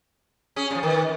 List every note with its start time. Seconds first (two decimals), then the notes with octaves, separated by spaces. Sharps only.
0.56 C#4 G#4
0.71 A#2 F3
0.83 D#3 A#4 B4